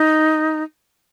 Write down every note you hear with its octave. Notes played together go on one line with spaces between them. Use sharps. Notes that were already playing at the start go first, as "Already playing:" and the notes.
Already playing: D#4